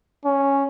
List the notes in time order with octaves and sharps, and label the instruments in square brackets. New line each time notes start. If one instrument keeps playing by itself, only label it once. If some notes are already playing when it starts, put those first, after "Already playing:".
[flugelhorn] C#4